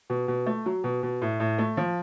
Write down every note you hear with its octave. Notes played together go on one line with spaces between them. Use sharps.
B2
B2
A3
F#3
B2
B2
A2
A2
A3
F3